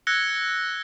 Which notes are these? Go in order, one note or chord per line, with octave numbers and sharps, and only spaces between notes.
E6 F#6 G#6 A#6 C#7 G7